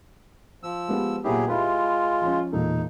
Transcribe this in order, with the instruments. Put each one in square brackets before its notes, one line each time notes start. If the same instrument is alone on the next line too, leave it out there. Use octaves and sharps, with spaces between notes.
[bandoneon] F3 E6
[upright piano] G#3 B3 G4
[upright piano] A#2 B3 E4 [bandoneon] F#3 G4 G#4
[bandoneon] G#3 F4 [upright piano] E4 G4 B4
[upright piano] F3 C#4
[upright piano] E1 A#2 A4 [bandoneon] D#4